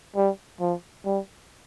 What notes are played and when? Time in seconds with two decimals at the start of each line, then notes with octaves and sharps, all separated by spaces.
0.16 G3
0.60 F3
1.05 G3